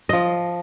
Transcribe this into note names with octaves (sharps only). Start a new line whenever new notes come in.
F3 D#5